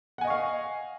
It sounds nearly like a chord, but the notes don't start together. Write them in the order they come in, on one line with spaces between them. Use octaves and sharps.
F#5 G#5 D#5 C#6 F5